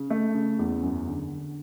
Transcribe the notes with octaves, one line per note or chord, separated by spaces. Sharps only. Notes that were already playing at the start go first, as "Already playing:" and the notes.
Already playing: C#3
A3
C#3
E2
F#2
D3
D3